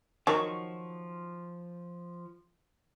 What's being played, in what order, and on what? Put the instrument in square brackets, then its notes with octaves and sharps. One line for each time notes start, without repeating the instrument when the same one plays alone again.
[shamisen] D#3 F#3 [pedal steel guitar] F3 C#6